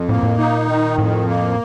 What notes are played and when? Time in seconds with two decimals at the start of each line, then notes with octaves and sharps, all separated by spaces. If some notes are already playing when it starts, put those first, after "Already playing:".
Already playing: F2
0.09 A2 A#3
0.23 A2
0.38 A#2 D#4
0.68 D#3
0.97 F2 A2
1.27 A#3